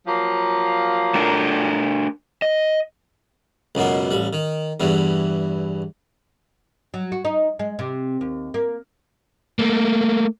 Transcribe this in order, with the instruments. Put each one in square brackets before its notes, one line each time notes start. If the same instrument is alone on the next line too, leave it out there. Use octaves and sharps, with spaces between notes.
[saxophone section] F3 F#3 A#3
[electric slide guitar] A3 D4 A#4
D#5
[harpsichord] C#2 F#2 B2 A#3
A1 G3
D#3
E2 G2 E3
[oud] F#3
F#4
D#4
G#3
C3
D#2
A#3
[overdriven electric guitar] A3 A#3